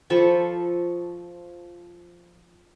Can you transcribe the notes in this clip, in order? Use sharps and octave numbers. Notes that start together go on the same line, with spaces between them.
F3 A4 B5 C#6